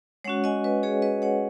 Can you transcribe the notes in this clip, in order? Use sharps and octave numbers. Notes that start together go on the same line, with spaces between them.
G#3 C#4 F#4 C#5 F#5
D#5 G#5
B4 D#5
G#4 C#5
B4 D#5
C#5 F#5